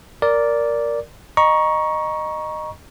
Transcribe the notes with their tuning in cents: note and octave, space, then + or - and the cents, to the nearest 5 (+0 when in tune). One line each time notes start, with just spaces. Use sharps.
A#4 +0 D5 -10
D#5 -15 A#5 +25 C#6 +0